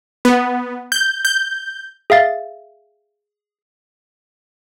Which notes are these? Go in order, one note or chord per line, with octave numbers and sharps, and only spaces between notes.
B3
G6
G6
G#4 E5 F5 A6